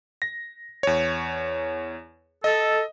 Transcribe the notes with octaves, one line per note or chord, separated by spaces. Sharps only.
A#6
E2 C#5
A4 D#5